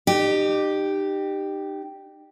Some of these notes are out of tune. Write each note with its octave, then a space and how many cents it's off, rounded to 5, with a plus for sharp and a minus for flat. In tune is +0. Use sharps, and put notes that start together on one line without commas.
D#4 -35 G4 +0